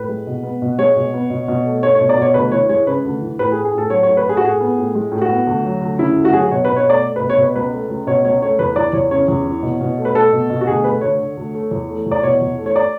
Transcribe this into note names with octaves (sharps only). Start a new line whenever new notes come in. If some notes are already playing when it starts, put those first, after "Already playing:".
Already playing: A2 B4
G#3
B2
B3
B2
G#3 C#5
B2
B3
B2
B2
A3
A3 C#5
C#5
B2
D5
B2 C#5
D2 B4
E3 C#5
G#3 C#5
C#3 B4
D2
E3
A2 B4
G#4
A3
G#4
A2 A4
F#3 C#5
C#5
A2
B4
A3 G#4
F#4
A2 G#4
B3
A2
G#3
A2
F#4
B3
D2
F#3
D2
C#3 E4
D2
F#4
F#3 G#4
F#4
B2 C#5
B2 B4
C#5
A3 D5
A3
B2 B4
C#5
B2 B4
C#2 B4
A3
C#2
B2 C#5
C#2 C#5
A3 C#5
E2 B4
E3 D5
E2 C#5
C#3 C#5
E2
E3
B2
B2
A3
B4
A3 A4
B2
B2
F#4
D2 G#4
A3 B4
D2 C#5
D3
D2
A3
E2
A3
E2
D5
B2 C#5
E2
A3
C#5
D5